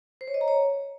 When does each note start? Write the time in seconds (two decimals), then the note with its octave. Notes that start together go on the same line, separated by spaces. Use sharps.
0.21 C5
0.28 C#5
0.34 D#5
0.41 A#5
0.48 C#5